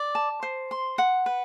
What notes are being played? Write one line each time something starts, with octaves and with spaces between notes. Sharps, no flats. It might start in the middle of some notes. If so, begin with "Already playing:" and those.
Already playing: D5
A5
C5
C6
F#5
B4